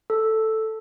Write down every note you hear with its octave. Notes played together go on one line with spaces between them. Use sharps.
A4